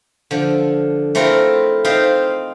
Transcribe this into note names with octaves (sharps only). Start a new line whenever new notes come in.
D3 F3
A3 C4 E4 F4 A#4
C4 D#4 F4 C5 E5 F5